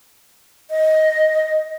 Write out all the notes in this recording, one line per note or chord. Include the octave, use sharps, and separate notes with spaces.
D#5